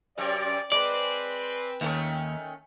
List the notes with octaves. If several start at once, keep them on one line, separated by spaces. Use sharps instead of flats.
F#2 C3 C#4 D5
G#3 C4 B4 D5
D#2 D#3 A3 C#4